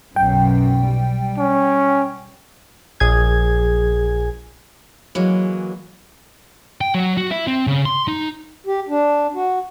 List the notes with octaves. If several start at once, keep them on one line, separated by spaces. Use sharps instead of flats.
B1 F#2 G5
G3
C#4
A#1 G#4 G#6
E3 F#3 G#3 A#3
G5
F#3
F#4
E4
C4
C#3
C6
D#4
G4
D4
F#4